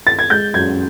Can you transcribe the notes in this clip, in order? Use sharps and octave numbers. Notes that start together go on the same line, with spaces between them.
A6
G#6
G#3 G6
F#2 G#6